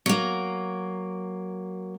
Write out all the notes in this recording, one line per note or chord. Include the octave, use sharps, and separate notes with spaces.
F#3 A#3